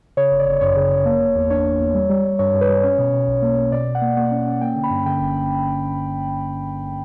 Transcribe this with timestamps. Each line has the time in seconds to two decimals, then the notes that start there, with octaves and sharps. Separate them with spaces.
0.17 C#3 C#5
0.31 G1
0.39 D5
0.47 G1
0.61 F#2 C#5
0.76 C#3
0.90 G1
1.05 A#3
1.20 A#3
1.36 E2
1.50 D4 C#5
1.65 D4
1.80 E2
1.94 G3
2.10 G3
2.24 G3
2.39 G2 C#5
2.54 G2
2.61 B4
2.69 G3
2.83 C#4 C#5
2.98 B2
3.13 B2
3.28 B1
3.42 A#3
3.58 A#3
3.72 B2 D5
3.87 B2
3.95 F#5
4.02 A#3
4.17 A#3 F#5
4.31 C#4
4.47 C#4
4.61 A#3 G5
4.76 D3
4.83 B5
4.90 G2
5.06 D3 G5
5.21 G1